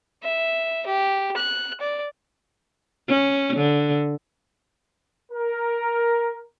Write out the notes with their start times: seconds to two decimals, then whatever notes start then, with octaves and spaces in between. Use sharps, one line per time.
0.23 E5
0.86 G4
1.36 F#6
1.80 D5
3.08 C#4
3.57 D3
5.32 A#4